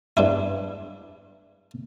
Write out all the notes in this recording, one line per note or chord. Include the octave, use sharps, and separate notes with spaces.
G2 D4 E4